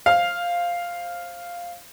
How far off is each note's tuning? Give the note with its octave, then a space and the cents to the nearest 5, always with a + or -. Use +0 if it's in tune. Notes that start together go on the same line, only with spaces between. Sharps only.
C5 +20 F5 +0